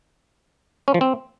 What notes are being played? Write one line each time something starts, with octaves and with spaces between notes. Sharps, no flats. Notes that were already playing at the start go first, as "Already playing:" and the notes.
C#4
F3
C4